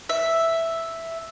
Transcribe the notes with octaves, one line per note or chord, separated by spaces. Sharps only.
E5